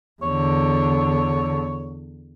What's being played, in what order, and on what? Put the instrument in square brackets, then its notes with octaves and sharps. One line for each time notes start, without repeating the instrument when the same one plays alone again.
[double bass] E2 D3 [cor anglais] C#5